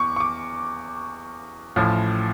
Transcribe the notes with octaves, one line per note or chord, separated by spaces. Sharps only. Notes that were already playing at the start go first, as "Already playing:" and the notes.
Already playing: E2 C#6 D6
C#6
D6
A1 A2 F3